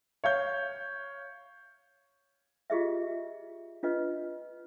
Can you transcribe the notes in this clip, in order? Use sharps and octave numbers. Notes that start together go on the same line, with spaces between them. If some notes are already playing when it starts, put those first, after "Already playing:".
C#5 F5 G6
F4 G4 G#4 D#5 E5
D4 F4 B4 D#5